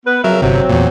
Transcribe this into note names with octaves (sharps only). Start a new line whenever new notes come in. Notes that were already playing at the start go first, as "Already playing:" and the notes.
B3 B4
F2 C#3 F#3 A#4 E5
G1 C3 F#3 C4
E2 A#2